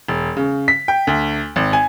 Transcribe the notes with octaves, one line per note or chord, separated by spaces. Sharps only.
E1
C#3
B6
G5
D2
G#1
G#5